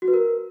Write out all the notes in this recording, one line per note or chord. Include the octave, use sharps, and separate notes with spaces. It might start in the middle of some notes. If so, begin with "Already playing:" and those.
F#4
B4
A#4